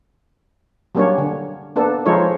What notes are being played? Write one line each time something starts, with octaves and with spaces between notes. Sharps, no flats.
F#3 G3 A#3 C#4 D4 C#5
D3
A#3 B3 D4 A4
F3 G#3 D#4 F4 A4 C#5